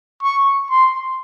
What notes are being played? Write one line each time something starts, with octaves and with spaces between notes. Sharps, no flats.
C#6
C6